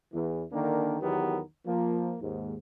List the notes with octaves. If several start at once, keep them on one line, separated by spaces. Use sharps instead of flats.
E2 E3
D3 D#3 A#3 D4
E2 D#3 F#3 B3 G4 A#4
F3 A#3
D#2 G#2